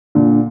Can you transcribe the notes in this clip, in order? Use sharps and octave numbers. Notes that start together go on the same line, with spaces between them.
A#2 D3